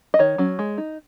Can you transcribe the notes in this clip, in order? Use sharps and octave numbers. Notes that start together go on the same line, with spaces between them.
D#5
D#3 C#5
F#3 C#4
G#3
D#4